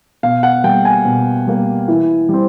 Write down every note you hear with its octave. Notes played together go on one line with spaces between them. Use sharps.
B2 F5
F#5
G3 A#3 G5
G#5
B2
G3 A#3
E3
G3 C4